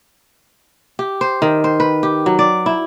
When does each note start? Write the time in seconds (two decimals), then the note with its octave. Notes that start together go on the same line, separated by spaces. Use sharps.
0.99 G4
1.21 C5
1.42 D#3
1.64 C5
1.80 B4
2.03 G4
2.26 F#3
2.39 D5
2.66 E4